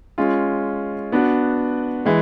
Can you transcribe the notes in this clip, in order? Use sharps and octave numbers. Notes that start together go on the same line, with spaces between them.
G#3 C#4 F4
B3 D4 F#4
E3 G#3